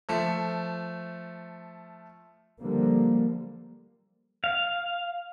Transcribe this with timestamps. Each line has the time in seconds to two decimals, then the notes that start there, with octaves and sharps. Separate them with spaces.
0.09 F3 A3
2.60 D3 F3 G3 A#3
4.44 F5